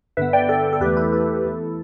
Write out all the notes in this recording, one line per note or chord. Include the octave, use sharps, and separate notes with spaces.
G2 D3 B3 B4 E5
D5 G5
A4 D5
A4
E2 E3 A3 G4 B4
E4 A4
E4 A4
E2 E3 A3